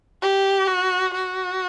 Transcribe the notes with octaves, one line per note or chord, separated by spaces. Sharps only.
G4
F#4
F#4